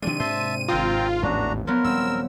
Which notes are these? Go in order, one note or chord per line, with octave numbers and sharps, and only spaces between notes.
C3 D#3 F3 G#3 D4 D#7
G#2 C3 C5 E5 A5
G#1 C4 F4 G5 A#5 D#6
A1 D#2 G#2 B3 D4 F#4 A#5
F3 F#3 B3 A#4
D#1 G3 C4 E6